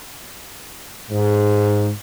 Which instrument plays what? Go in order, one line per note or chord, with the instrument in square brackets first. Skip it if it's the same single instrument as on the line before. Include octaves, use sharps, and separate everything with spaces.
[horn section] G#2